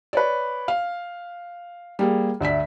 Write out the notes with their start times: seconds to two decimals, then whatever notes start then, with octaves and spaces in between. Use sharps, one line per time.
0.13 B4 C#5 D5
0.68 F5
1.99 G3 A#3 G#4
2.41 D2 D5 E5 B6